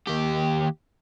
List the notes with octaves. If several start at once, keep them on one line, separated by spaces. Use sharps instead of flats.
D#2 G4